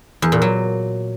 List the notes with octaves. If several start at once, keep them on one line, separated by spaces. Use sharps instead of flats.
E2
A#2
F#3